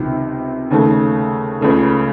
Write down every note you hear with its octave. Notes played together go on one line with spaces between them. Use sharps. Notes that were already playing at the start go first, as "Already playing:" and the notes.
Already playing: C#2 C3 D#3
D#2 C#3 A3
C#2 C#3 A3